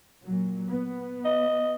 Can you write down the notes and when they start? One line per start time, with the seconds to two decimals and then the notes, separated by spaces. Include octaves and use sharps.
0.24 A#2 F#3
0.71 B3
1.25 D#5